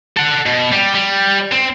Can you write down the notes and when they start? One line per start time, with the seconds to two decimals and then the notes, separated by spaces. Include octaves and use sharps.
0.17 A4 F#5
0.46 B2
0.72 G3
0.95 G3
1.52 C4